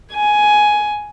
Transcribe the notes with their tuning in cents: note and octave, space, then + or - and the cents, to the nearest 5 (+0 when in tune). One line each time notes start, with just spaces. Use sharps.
G#5 +10